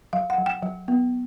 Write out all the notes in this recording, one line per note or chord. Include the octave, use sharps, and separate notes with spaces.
F#3 F5
F#5
F#3
G5
F#3
B3